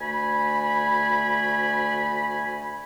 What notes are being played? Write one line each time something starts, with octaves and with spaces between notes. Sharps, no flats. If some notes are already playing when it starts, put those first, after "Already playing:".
D2 A3 G#5 B5